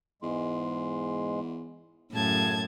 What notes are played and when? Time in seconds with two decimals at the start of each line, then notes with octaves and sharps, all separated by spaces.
0.22 E2 G#2 G#3 C6
2.13 F#2 A2 C#3 A5 G#6